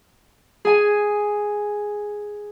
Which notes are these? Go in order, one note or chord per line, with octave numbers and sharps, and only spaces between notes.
G#4 G#5